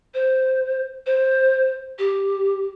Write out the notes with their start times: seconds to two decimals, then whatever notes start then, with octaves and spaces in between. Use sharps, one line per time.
0.14 C5
1.06 C5
1.98 G4